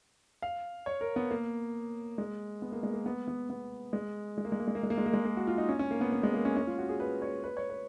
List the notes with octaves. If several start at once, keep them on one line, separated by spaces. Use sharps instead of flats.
F5
C#5
A#4
B3
A#3
G#3
B3
A#3
G#3
A#3
B3
B3
B3
G#3
G#3
A#3
G#3
A#3
G#3
A#3
G#3
A#3
G#3
A#3
G#3
A#3
F#4
F4
D#4
C#4
C#4
A#3
B3
B3
G#3
A#3
C#4
C#4
F4
F#4
G#4
B4
C#5
B4
C#5
B4